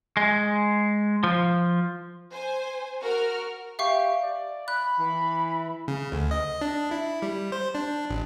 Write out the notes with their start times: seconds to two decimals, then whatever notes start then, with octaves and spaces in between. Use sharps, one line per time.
0.17 G#3
1.24 F3
2.32 C5 G#5
3.02 F#4 A#4 F6
3.79 G4 E5 F5 C#6
4.23 D5
4.68 B5 F#6
5.00 E3
5.88 C#3
6.12 D2
6.31 D#5
6.61 D4
6.91 E4
7.22 G3
7.52 C5
7.75 D4
8.10 A1